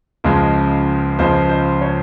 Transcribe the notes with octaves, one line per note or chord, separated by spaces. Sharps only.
C#2 C#3 F3 G#3
C#2 C#3 F3 G#3 C5
C5
C#5